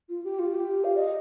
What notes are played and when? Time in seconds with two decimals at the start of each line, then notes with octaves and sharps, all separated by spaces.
0.09 F4
0.24 G4
0.39 F4
0.54 G4
0.84 F5
0.95 D5
0.99 D#5